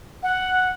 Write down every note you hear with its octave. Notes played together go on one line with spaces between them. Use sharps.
F#5